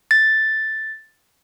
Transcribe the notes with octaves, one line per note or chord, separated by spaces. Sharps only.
A6